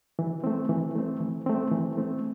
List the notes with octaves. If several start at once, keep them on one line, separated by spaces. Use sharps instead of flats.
E3
A3 C4
E3
A3 C4
E3
A3 C4
E3
A3 C4